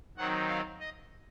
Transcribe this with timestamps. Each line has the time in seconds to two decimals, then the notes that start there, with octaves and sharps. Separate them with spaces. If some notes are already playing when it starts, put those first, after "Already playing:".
0.17 D#3 F#3 C4 D#4 F#5
0.48 F5
0.80 D#5